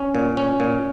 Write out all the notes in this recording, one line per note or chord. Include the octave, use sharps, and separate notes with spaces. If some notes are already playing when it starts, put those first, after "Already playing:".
Already playing: C#4
A#2
C#4
A#2